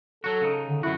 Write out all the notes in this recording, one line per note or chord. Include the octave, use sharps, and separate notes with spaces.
F#3 F#4 A4
C#3 D#4
D3
F#2 E4 F#4